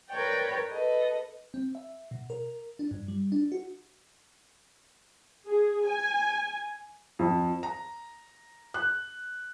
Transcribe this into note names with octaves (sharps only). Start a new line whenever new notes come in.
A#4 B4 C#5 D5 G5
A4 B4 D#5
C4
E5
B2
A#4
D4
G2
G3
D4
F#4
G#4
G#5
F2
A#5
F#6